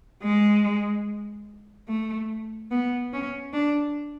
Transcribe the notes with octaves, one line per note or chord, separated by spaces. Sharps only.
G#3
A3
B3
C#4
D4